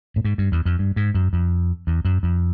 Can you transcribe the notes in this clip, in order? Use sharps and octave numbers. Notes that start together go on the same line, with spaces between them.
A2
G#2
G2
E2
F2
G2
G#2
F#2
F2
E2
F#2
F2